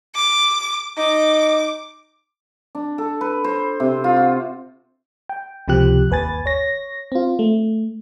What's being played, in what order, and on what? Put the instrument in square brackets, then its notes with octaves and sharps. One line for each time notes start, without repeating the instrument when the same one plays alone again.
[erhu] D6
[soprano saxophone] D#4 [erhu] D6
[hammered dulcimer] D4
A4
B4
C5
C3
F4
F#4
[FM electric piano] G5
C#2 C3 F3 G4 F#6
G1 D#2 B4 G#5 A6
C#5 A#6
C4 F4
A3